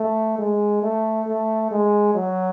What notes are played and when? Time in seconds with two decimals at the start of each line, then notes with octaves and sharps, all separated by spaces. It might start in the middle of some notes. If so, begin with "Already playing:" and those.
Already playing: A3
0.39 G#3
0.83 A3
1.27 A3
1.71 G#3
2.15 F#3